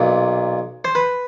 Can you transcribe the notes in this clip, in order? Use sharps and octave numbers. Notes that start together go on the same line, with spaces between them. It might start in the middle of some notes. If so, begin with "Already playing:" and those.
Already playing: B1 A#2
C5
B4